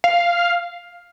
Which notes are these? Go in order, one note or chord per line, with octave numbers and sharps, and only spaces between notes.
F5